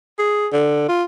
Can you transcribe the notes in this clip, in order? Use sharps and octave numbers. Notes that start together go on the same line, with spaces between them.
G#4
D3
F4